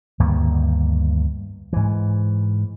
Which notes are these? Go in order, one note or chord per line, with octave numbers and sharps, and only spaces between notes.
D2 G2 D#3 A#3
G#2 E3